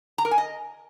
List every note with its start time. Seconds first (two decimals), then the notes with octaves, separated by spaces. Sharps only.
0.18 A#5
0.25 A#4
0.31 G#5
0.38 D#5